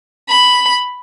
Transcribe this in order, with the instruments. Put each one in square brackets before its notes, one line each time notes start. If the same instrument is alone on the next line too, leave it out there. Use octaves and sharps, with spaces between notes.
[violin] B5